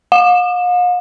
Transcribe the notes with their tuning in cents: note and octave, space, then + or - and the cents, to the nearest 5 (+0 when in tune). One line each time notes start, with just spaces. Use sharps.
F5 +45